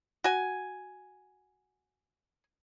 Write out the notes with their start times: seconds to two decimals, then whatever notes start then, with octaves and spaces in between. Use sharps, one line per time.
0.24 F#4 G#5